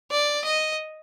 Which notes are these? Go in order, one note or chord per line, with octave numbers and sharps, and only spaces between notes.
D5
D#5